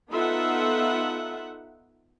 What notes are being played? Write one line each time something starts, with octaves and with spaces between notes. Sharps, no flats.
B3 D#4 F4 A4 E5 F#5